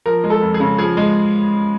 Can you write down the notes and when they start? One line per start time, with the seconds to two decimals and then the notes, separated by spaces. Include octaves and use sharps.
0.06 F3 A#4
0.24 G#3
0.30 A4
0.42 F2
0.54 G#4
0.60 C#3
0.78 F3 G#4
0.97 G#3